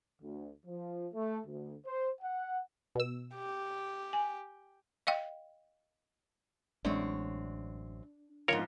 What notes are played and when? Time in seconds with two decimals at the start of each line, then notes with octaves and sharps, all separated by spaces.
0.22 D2
0.65 F3
1.13 A3
1.45 D2
1.86 C5
2.21 F#5
2.95 B2 E6
3.35 G4
4.13 G#5
5.07 D#5 F5 G5
6.85 A1 F#2 G#3 C4 D4 C#5
8.48 G#2 F3 F4 A#4 C#5